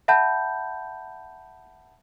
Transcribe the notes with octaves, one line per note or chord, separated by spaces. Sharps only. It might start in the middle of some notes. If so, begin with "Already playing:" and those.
E5 F#5 A5 B5 G6